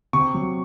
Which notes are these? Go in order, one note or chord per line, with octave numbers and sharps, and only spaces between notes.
C3 C#6
F#3